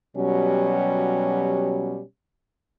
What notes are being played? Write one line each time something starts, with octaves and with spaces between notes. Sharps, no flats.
B2 F#3 G3 C#4 G4